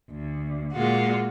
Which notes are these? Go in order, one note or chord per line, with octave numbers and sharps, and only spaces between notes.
D2
A#2 G#3 F4 F#4